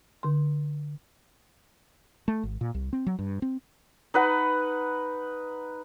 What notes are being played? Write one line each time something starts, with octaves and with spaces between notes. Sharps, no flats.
D3 C6
A3
G#1
A#2
C2
C4
F#3
G2
C4
D#4 B4 F#5